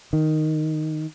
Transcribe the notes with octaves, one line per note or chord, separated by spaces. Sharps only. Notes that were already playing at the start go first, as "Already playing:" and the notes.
D#3